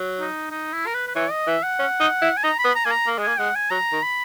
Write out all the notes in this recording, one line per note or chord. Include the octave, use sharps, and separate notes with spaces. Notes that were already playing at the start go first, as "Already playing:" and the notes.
Already playing: F#3
D#4
D#4
E4
A#4
B4
B4
E3 C#5
D#5
E3 E5
F#5
C#4
D#4
E4
G#5
D#4 A#5
B5
B3
A#5
A#3 G#5
A#5
A#3
G#3
A#3 G#5
G#3 F#5
G#5
F#3 A#5
D#3
B5